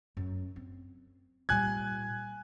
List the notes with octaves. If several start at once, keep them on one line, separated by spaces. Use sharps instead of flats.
F#2
C4
A#2 G3 G#5 F#6 G#6